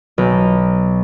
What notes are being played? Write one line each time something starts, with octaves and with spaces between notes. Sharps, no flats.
B1